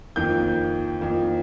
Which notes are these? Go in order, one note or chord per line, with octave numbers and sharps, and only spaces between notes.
F2 D#3 A#3 G6
F2 D#3 A#3